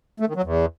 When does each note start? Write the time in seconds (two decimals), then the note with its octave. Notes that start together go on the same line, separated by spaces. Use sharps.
0.20 A3
0.28 D#3
0.36 F#3
0.44 E2